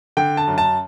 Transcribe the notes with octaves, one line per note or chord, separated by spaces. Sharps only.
D3 G5
A5
F#2
A5